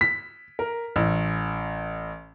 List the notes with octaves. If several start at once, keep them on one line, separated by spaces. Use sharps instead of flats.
B6
A#4
A1